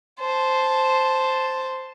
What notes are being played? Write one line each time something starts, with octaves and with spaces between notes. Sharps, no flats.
C5 A5